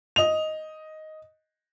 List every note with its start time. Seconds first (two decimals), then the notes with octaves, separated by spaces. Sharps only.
0.16 D#5 F7